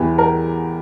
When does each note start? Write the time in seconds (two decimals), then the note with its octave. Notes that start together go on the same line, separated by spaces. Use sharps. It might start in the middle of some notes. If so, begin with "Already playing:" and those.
Already playing: E2 E3 G4
0.18 A#4